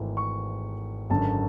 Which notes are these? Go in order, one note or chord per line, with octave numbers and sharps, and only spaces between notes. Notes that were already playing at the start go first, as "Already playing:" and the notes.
Already playing: G#1 G#2 E3 A3
C#6
G#1 F#2 D3 A5